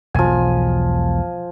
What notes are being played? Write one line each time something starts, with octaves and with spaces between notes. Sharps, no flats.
E1 B1 F3 G#5